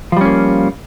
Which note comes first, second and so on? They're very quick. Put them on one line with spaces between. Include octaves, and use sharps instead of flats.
F3 G3 C#4 A#3